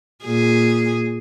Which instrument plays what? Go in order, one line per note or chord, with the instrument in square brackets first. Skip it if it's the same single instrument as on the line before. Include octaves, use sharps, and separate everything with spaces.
[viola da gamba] A#2 G#4